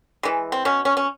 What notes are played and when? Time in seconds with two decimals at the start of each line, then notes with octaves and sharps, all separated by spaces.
0.23 E3 G#3
0.52 C4
0.65 B2 C#4
0.85 C#4
0.97 C#4